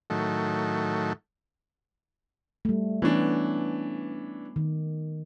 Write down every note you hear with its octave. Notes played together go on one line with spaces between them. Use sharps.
A2 D#3 F#3 A3
G3 A3
E3 B3 C#4 D4
D#3